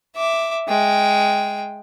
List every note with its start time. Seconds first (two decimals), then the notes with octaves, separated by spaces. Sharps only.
0.16 E5 D6
0.68 G#3 G5